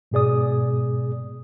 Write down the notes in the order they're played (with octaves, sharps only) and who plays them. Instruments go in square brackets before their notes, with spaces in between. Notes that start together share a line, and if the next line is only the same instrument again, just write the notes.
[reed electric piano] G#2 B2 G#4 D5 D#6